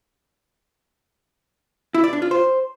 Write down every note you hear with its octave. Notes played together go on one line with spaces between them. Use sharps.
E4
D5
D4
F4
C5